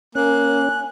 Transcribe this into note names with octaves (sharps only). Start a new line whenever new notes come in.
A#3 C#4 G#5 F#6